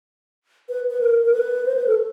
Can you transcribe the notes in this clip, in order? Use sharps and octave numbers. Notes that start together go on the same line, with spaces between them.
B4
B4
A#4
A#4
B4
C5
B4
A4